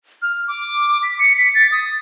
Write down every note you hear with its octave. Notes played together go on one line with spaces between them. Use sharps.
F6
D6
B6
C#7
B6
A6
D#6